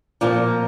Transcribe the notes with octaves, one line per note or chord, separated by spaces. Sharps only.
A#2 F3 A#3 F4